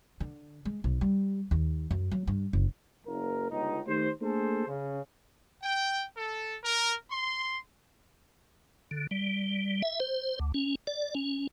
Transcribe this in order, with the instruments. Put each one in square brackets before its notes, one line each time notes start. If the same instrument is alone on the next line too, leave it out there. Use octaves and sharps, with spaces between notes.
[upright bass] D3
G#3
B1
G3
D#2
F#2
F#3
G2
F#1
[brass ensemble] F#1 A#4
G1 C#2 D#4
D#3 A3 G4 C5
A3 A#3 D4 G#4 A4 C5
C#3
[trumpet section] G5
A4
A#4
C6
[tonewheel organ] D3
G3
E5
C5
D2
C#4
D5
C#4